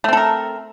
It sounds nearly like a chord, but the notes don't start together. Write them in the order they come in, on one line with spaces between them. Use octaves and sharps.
A3 C4 A4 A#4